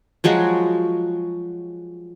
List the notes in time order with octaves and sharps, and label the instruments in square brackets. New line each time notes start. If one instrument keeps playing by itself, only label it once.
[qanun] F3 F#3 G#3 F#4